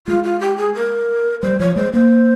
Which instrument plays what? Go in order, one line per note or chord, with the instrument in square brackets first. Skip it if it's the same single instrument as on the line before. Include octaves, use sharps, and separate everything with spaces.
[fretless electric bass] G#3 [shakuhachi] F4
[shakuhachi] F4
G4
G#4
A#4
[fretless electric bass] G3 [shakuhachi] C5
[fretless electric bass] F3 [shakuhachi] C#5
[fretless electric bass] G#3 [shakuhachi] C5
[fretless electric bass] A#3 [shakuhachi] C5